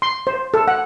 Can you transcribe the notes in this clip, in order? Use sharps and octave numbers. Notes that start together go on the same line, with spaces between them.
C6
C5
A4
F#5